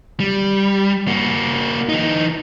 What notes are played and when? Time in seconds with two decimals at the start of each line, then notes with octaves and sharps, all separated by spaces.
0.20 G3
1.08 A#3 F#4
1.89 E3 D#4